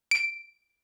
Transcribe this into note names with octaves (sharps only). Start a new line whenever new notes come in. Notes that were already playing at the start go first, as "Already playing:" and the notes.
D7